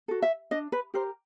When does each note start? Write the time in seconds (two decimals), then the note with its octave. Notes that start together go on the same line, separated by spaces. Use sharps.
0.08 F#4 A4
0.22 E5
0.51 D4 D#5
0.72 B4
0.94 G4 A#4 C5